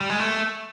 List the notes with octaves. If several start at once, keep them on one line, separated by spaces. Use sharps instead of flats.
G3
G#3
A3